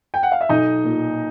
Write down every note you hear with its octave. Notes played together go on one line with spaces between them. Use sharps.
G5
F#5
F5
E5
B1 D#4 D#5
A#2